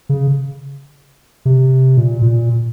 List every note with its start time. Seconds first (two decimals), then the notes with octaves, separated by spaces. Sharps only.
0.09 C#3
1.45 C3
1.97 A#2
2.22 A#2